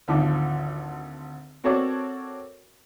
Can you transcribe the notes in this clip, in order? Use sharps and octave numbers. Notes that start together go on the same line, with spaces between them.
G#1 D2 F3 D#4 D6
C4 F#4 A4 A#4 C#5 D5